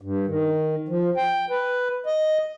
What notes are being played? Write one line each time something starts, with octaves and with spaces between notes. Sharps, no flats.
G2
D#3
F3
G5
B4
D#5